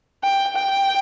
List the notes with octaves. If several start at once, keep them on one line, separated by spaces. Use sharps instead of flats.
G5
G5